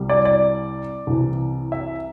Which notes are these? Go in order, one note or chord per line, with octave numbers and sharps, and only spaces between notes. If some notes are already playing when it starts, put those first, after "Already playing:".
Already playing: C2 C3 G3
D5
D5
C2 C3 E3
E5